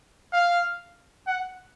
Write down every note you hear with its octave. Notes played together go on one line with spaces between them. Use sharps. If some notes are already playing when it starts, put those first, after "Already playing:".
F5
F#5